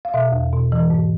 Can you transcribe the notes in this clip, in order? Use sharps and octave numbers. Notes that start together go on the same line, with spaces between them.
F5
B2 E5
E2
B2
E3
G#2